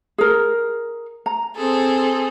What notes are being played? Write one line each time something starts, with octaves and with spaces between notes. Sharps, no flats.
G#4 A#4
A#5
C4 G#4 A4